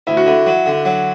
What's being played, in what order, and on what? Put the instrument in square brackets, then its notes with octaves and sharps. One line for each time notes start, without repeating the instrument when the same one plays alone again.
[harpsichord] D2 [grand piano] E4
[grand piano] F#4
[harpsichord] D3 [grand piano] E4
[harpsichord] F#3
D3
F#3